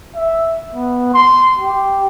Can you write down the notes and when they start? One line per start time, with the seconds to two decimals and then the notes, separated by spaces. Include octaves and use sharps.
0.15 E5
0.74 B3
1.14 C6
1.59 G4